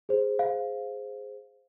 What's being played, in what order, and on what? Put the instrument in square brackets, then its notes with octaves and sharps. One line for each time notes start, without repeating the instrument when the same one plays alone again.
[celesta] G#4 C5
[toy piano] F5